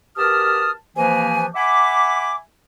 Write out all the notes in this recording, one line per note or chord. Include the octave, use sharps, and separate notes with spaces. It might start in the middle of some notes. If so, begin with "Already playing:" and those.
B2 G4 A#4 A5 D#6 F6
C3 E3 F3 A#3 B4 G#5
E5 F#5 G#5 B5 D6